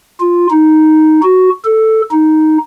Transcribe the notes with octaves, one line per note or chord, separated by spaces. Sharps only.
F4
D#4
F#4
A4
D#4